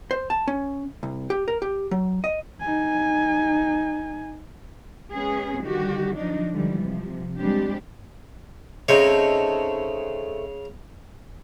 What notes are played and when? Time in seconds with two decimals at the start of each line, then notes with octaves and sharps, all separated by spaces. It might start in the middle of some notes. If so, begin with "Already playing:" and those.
0.11 C5
0.30 A5
0.47 C#4
1.03 C2
1.30 G4
1.48 A#4
1.62 G4
1.91 F#3
2.24 D#5
2.61 D#4 G#5
5.13 G#3 B3 C#4 G#4
5.63 D3 D#3 G3 F#4 G4
6.16 F3 F#3 D4 D#4
6.52 D3 E3 F3 G3 G#3
6.82 C3 F3
7.37 G3 G#3 C4 D4 G4
8.89 C#3 A3 C4 D#4 C#5